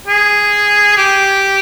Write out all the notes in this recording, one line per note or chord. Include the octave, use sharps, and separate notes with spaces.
G#4
G4